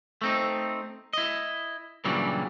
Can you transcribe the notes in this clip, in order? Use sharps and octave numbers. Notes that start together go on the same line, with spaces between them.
A3 C4 D#4
E4 D#5
G2 A#2 C#3 E3 F#3 G3